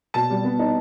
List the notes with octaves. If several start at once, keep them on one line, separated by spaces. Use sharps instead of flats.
B2 A5
G3
B3
D#4